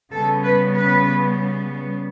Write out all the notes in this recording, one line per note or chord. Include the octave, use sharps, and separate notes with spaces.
C#3 G3 B3 A4
B4
B4